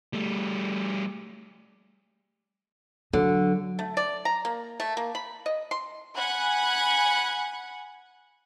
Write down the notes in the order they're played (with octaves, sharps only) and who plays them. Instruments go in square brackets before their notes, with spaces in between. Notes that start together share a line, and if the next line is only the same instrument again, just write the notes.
[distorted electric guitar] G3 A3
[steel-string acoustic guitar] D3 [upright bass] F#3
[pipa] A3
D5
A#5
A#3
A3
A#3
B5
D#5
C6
[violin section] F#5 G#5 B5 F#6 G#6